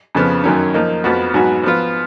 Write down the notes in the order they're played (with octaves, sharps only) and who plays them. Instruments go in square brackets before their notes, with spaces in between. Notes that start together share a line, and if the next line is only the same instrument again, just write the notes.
[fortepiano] F2 C#3 F3 B3
F#2 D#3 F#3 C#4
F3 A#3 D#4
F2 F3 B3 F#4
G#2 F#3 B3 F#4
F3 B3 F4